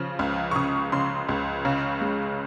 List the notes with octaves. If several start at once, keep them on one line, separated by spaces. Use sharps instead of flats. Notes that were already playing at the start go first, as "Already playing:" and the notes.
Already playing: C#3 F3
C#2 F6
C#6
C#3 D#6
C#3 C6
C#2
C#3
G#3